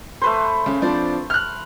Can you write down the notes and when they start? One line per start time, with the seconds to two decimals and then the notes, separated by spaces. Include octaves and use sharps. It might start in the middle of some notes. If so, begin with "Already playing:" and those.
0.21 A3 B4 C5
0.66 C#3
0.82 F3 C4 D4
1.30 F6 F#6